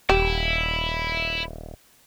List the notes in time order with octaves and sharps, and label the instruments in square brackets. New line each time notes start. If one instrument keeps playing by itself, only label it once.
[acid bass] D#1 [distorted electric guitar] E4 [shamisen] G4